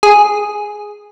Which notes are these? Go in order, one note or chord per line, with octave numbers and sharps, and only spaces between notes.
G#4